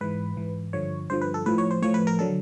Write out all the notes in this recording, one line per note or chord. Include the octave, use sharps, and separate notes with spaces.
G#2 E3 B4
G#2 E3
G2 D3 F3 C#5
G2 D3 F3 C5
B4
A4
A2 F3 B4
C#5
C5
A2 F3 C#5
B4
A#4
D3 F#3 A4